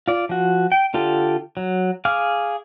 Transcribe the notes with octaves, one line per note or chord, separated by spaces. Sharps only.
F4 D5
F3 F#4
G5
D3 F4 G4 A4
F#3
G#4 F5 D6 F6